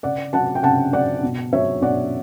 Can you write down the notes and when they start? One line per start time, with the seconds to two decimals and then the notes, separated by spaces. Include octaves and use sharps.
0.03 C#3 D5 F#5
0.33 F#3 F#5 A5
0.55 G5
0.63 C#3 F#5 A5
0.93 F#3 D5 F#5
1.23 B2
1.53 F#3 C#5 E5
1.81 B2 D5 F#5